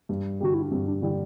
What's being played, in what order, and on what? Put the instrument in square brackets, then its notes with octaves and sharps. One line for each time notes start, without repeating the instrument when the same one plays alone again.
[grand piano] G2
[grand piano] D3 G3 [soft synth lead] F#4
[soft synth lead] E4
D4
[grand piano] G2 [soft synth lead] C4
[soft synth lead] D4
[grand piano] D3 G3 [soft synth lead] E4